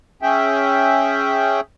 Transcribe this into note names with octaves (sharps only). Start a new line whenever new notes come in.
C#4 G#4 E5 G5